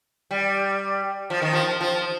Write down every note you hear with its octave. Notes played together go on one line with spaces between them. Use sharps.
G3
F3
D#3
F3
F3